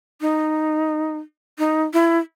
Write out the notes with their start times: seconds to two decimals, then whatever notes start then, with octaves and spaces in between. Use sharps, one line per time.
0.21 D#4
1.59 D#4
1.93 E4